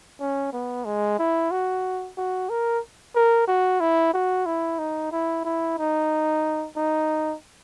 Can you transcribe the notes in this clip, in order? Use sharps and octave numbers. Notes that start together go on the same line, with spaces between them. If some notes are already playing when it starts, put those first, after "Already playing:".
C#4
B3
G#3
E4
F#4
F#4
A#4
A#4
F#4
E4
F#4
E4
D#4
E4
E4
D#4
D#4